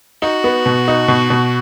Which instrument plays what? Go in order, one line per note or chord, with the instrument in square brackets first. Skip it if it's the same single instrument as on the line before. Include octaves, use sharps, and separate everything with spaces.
[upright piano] D#4 [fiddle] F#4
[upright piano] B3
B2
D#4
B2
B2